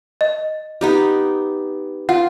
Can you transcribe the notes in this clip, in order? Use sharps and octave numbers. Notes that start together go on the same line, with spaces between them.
D#5
B3 D#4 G4
F4 F#5